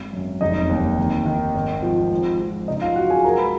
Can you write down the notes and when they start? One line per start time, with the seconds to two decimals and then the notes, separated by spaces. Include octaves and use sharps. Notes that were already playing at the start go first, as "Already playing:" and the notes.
Already playing: G#1
0.13 F#2
0.41 F1 D#4 D#5
0.69 D#2
0.98 D#3
1.26 D#3
1.54 G#1
1.82 F3
2.11 G#2
2.39 F3
2.68 C#3 D#4 D#5
2.82 F4 F5
2.96 F#3 F#4 F#5
3.10 G#4 G#5
3.24 G#3 A#4 A#5
3.38 B4 B5